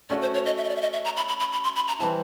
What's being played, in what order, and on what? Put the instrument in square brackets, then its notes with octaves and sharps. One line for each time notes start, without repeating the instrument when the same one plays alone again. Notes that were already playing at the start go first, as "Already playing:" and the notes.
[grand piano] A3 C#4 F#4 [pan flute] D5
[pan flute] C5
C#5
D#5
E5
D#5
D5
E5
D#5
E5
A#5
B5
B5
B5
B5
C6
B5
A#5
[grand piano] E3 G3 C4 E4 [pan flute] A5